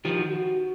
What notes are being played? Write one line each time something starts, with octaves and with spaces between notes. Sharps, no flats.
D#3 F3 G4
F#4
F#4